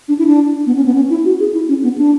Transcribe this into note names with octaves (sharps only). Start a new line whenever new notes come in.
D4
E4
D4
B3
C#4
B3
C#4
E4
F#4
G#4
E4
C#4
B3
D4